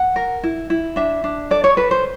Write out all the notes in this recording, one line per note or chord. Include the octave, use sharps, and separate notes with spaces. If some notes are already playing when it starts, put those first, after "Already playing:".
Already playing: F#5
A#4
E4
E4
D4 E5
D4
A4 D5
C#5
A4 B4
C5